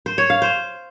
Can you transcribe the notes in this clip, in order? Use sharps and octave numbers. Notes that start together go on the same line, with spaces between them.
C5
C#5
F5
C5